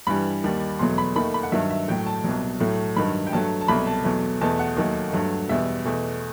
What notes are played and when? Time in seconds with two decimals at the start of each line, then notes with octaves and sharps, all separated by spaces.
0.07 G2 E3 G3 B5
0.44 D#2 D#3 G3
0.79 E2 B2 F#3 A3 C6
0.98 B5
1.16 D#2 D#3 A3 B5
1.34 B5
1.43 F#5
1.52 G2 D#3 F#3 E5
1.70 E5
1.88 A2 F#3 A3 G5
2.06 A5
2.24 C2 B2 F#3
2.60 A2 F#3 A3
2.96 G2 D#3 F#3 B5
3.27 G5
3.33 G2 F#3 A3 A5
3.61 A5
3.68 C2 B2 F#3 A3 B5
3.87 A5
4.04 E2 B2 F#3 A3
4.41 E2 B2 A3 A5
4.59 F#5
4.77 D#2 D#3 F#3 A3
5.13 G2 F#3 A3
5.49 E2 B2 G3 E5
5.85 E2 B2 A3